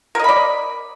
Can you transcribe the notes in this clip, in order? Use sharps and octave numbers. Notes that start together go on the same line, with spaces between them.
A#4 D5 D#5 B5